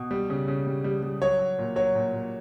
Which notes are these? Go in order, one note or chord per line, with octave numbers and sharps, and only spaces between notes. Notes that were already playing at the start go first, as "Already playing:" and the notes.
Already playing: B2
G3
C#3
C#3
G3
G3
G3
F#3 C#5
F#3
A#2
F#3 C#5
A#2
A#2